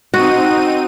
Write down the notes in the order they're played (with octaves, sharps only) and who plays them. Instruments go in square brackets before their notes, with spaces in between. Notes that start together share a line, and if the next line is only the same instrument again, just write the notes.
[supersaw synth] C4 D#4 D#7 [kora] F#4